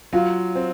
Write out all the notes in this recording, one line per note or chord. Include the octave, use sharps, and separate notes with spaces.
F#3 F4 F5
C4